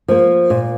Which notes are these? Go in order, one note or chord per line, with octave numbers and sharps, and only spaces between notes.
F3 A#3
A#2